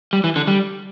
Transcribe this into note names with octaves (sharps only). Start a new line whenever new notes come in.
G3
E3
D3
G3